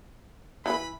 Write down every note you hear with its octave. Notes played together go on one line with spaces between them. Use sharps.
E3 D#4 B4 B5